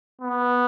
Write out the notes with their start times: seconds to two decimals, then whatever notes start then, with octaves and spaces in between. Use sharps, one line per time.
0.21 B3